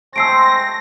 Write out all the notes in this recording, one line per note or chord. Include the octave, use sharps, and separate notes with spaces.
G#3 A3 C4 C5 E6 A#6 C7 D7